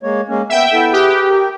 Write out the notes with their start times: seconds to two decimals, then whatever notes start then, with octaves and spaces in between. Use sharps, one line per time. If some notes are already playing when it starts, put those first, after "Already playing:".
0.03 G#3 A#3 C#5
0.28 G#3 A#3 C#4
0.50 B3 E5 G5
0.73 B3 E4 A4
0.93 G4 G#4 B4
1.30 A#4 G5